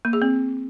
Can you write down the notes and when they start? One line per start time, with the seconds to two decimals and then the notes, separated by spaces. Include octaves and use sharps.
0.05 A#3
0.13 G#4
0.22 C4